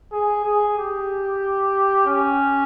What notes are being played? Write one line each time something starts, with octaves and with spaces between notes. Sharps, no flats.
G#4
G#4
G4
C#4